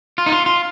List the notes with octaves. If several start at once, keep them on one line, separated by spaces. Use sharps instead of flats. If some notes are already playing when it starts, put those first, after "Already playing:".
F4
D#4
F4
F4